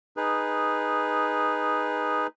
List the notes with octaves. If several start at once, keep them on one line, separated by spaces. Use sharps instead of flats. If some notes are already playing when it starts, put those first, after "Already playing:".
D#4 G#4 B4